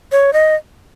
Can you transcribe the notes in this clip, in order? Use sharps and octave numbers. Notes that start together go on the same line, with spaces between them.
C#5
D#5